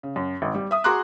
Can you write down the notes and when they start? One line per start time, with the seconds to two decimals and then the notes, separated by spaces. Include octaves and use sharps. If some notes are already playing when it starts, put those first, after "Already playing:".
0.03 C#3
0.16 F#2
0.42 G#1
0.54 G3
0.71 E5 D#6
0.84 F#4 G#4 A#5 C6 D6 F#6